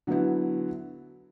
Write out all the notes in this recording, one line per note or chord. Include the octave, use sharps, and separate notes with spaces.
D3 F#3 B3 E4